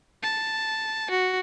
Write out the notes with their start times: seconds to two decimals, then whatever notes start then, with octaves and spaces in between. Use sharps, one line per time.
0.23 A5
1.11 F#4